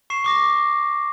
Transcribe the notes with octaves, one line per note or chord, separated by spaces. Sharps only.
C#6 C7 E7
C#6 D6 A#6